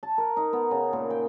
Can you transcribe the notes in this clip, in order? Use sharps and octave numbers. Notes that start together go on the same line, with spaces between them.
A5
A#4
D#4
B3
C#3
A#2
G5